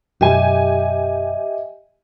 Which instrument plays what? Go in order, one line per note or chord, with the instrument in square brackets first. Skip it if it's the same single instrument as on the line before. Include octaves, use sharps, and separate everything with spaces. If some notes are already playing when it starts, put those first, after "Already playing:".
[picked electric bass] B1 F#2 [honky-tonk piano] G4 G#5 [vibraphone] D#5 E5